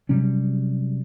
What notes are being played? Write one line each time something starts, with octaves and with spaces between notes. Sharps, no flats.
C3 F#3 G3 C#4